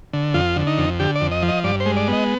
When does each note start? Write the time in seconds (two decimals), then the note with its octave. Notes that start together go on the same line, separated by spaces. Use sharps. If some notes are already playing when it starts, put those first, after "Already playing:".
0.13 D3
0.34 F2 F4
0.56 D3
0.67 D#4
0.78 F2
1.00 D3 G4
1.16 D5
1.21 F2
1.31 D#5
1.43 F3
1.48 D#5
1.64 G2 D5
1.80 C5
1.86 G#3
1.97 D5
2.08 B3 D#5